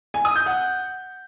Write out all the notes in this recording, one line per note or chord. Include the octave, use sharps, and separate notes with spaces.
G#5
D#6
G6
F#5